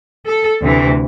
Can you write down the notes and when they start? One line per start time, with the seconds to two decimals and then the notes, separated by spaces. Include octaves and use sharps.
0.26 A4
0.60 D2 C3 E3